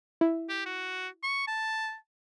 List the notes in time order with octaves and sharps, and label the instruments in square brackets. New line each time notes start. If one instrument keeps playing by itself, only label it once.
[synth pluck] E4
[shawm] G4
F#4
C#6
A5